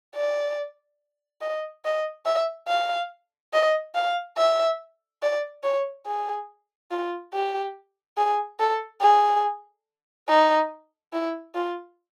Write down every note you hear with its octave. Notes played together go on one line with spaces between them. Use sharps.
D5
D#5
D#5
E5
F5
D#5
F5
E5
D5
C#5
G#4
F4
G4
G#4
A4
G#4
D#4
E4
F4